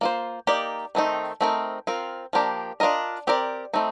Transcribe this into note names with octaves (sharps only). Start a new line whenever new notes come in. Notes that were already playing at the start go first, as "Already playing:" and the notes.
A#3 F4 C5
A#3 D#4 G4 D5
D#3 A3 C4 D#4
A3 C4 D#4 A#4
C4 F4 A#4
F3 A#3 D4 G4 A#4
D4 F4 A#4 D#5
C4 G4 A#4 D5
A3 C4 D#4